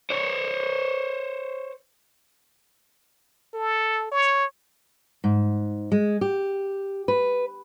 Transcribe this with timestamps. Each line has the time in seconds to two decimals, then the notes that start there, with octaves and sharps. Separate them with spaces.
0.11 C5 C#5
3.54 A4
4.11 C#5
5.24 G#2
5.92 G#3
6.21 G4
7.08 B4